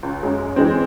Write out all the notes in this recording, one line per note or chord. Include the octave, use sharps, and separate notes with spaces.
C#2
F#2 F#3 G#3
E3 G#3 C4